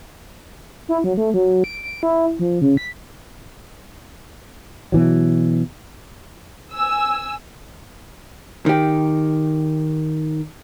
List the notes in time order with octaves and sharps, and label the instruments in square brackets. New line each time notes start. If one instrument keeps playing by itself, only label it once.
[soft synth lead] E4
F#3
A3
F#3
D7
D7
E4
F3
C#3
B6
[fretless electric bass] B2 E3 F#3
[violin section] G#5 E6
[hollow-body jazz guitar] D#3 G4